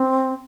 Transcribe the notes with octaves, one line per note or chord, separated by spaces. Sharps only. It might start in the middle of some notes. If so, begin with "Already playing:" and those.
Already playing: C4